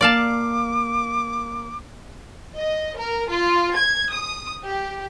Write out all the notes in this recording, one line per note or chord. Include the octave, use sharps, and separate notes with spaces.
A#3 D5 F5 A5 D6
D#5
A#4
F4
G#6
D#6
G4